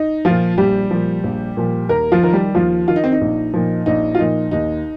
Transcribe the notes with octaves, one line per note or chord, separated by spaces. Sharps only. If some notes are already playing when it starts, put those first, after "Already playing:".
Already playing: D#4
A#2 F3 F4
A#1 G3 G4
A#2 F3
A#1
A#2 F3
D#2 A#3 A#4
F3 F4
D#3 A#4
G3 G4
D#2 F3 F4
D#3 F4
D#4
C4
D#4
A#1
A#2 F3
A#1 D#4
F4
A#2 F3 D#4
D#2 D#4